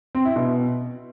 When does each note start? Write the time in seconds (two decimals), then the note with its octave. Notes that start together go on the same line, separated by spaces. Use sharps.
0.15 C4
0.25 E4
0.36 B2